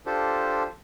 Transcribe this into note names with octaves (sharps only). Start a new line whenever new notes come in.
D4 F4 G4 A4 C5